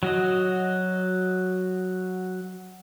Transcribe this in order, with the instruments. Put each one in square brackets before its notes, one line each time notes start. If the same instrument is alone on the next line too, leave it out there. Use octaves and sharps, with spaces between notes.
[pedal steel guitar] F#3 F#4 D#5